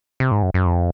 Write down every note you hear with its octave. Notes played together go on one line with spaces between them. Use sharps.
C3
G#2
F#2
F#2
F2